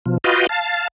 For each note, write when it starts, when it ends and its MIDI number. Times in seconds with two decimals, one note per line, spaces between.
0.06 0.18 47
0.06 0.18 53
0.24 0.47 65
0.24 0.47 66
0.24 0.47 71
0.24 0.47 75
0.24 0.47 77
0.24 0.47 79
0.49 0.88 77
0.49 0.88 81